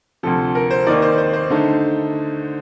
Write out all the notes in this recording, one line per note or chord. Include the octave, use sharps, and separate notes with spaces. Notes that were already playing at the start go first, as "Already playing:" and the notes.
D2 C3 F3 A4
A#4
C5
D#2 D#3 A#3 D#4 D5
C5
C5
C5
D3 A3 D#4